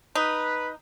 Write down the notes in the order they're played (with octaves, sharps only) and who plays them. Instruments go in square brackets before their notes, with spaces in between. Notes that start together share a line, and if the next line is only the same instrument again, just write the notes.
[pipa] D#4 [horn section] B4